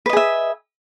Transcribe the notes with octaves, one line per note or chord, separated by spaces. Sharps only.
G#4 B4 D#5 E5